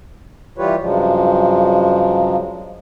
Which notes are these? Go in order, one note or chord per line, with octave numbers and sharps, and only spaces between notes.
E3 G3 F4 G4 B4 C#5
G2 C#3 F3 F#3 G#3